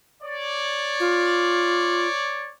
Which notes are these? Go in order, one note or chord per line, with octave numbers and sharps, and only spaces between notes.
C#5 D5
F4